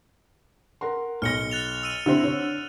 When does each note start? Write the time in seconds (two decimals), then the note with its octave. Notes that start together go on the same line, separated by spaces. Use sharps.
0.81 A#4 F#5 C6
1.22 B1 F6 A#6 C#7 G7
1.51 F#6 A6 F7
1.83 E6 D#7
2.06 D3 C4 E4 E5
2.24 D3 C#5